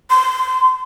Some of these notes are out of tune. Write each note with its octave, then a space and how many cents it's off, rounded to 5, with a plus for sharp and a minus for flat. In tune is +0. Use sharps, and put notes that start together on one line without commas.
C6 -25